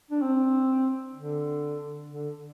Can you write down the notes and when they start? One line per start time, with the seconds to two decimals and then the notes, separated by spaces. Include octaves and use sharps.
0.11 D4
0.22 C4
1.15 D3
2.10 D3